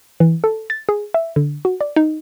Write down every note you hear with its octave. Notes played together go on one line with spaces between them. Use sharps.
E3
A4
A6
G#4
E5
D3
F#4
D5
D#4